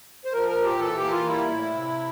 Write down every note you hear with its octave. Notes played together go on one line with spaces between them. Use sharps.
C5
F3 A#4
A#4
A#2
G4
E3 A4
G4
A#3
F4
G3 E4
A2
C3